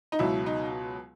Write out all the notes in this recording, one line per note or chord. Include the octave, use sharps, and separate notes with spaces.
D#4
C#2 B2 F#3 E4
D#4